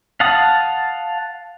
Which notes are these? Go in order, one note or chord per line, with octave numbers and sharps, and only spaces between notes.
F5 F#5 A5 D#6